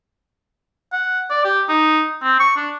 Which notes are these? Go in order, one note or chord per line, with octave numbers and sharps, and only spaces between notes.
F#5
D5
G4
D#4
C4
C#6
D4